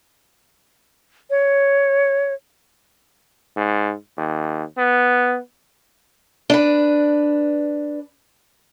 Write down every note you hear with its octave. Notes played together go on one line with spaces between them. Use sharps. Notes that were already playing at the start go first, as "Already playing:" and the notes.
C#5
G#2
D#2
B3
D4 B4